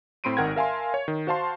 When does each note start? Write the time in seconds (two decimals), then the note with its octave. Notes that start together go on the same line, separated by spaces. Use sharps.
0.24 A2 C4 B5 C6 D7 D#7
0.37 G#1 D#3 A#4 F#5 G5 G#6
0.56 A#4 E5 F5 G#5 A5 C6
0.94 C#5
1.08 D#3
1.27 F#4 C5 F5 A5 C6